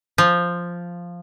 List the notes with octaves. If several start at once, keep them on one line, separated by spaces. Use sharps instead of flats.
F3